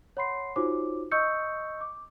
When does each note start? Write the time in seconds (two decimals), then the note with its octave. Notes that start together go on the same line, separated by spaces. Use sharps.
0.17 C#5 F#5 B5 C6 C7
0.56 D#4 F4 F#4 C5 C#5 D6
1.11 D#5 C#6 D#6 E6 G6 C#7
1.81 D6